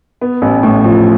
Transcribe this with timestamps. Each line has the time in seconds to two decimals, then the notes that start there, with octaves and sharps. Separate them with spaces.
0.21 B3
0.42 A1
0.63 A2
0.84 F3